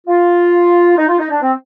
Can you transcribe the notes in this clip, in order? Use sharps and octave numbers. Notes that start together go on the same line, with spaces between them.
F4
D#4
F4
D#4
D4
C4